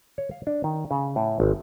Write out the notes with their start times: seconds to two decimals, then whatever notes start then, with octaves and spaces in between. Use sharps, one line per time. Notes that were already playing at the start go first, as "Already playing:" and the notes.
0.18 C#5
0.31 F5
0.47 D4
0.64 D#3
0.91 C#3
1.16 A2
1.40 G#1